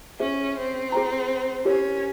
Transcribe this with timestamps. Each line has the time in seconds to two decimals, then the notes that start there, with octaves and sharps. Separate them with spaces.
0.19 C#4 G#4 C5 E5
0.57 C4
0.92 G#4 C5 G5 A#5
1.65 C#4 G4 A#4 C#5